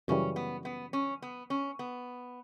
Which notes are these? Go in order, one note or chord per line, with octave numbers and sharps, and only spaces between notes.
F#2 C#3 E3 G3 C#4
B3
B3
C#4
B3
C#4
B3